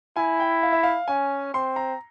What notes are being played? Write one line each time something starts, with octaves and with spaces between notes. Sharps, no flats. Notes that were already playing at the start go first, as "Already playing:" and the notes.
E4 G#5
G5
F5
E5
F5
C#4 G#5
C4 C6
A#5